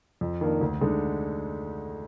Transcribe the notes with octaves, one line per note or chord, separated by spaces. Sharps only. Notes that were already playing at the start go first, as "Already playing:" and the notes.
F2
D#3 A#3 D4
D2
D3 G#3 D#4